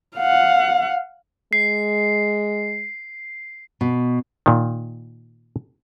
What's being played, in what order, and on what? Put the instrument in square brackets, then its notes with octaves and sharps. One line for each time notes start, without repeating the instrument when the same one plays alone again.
[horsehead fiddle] F5 F#5
[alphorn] G#3 [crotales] C7
[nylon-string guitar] B2
[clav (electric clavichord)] A#2 D#3